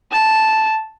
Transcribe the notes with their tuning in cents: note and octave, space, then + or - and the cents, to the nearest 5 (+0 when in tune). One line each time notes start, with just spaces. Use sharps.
A5 -5